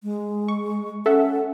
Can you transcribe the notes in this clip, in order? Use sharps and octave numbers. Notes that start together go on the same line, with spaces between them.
G#3
C#6
C#4 A4 E5 F#5